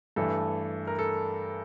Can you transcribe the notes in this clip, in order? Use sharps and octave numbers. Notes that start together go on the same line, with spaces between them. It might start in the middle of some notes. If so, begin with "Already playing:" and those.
G2 E3 A3 A4
A#4
A4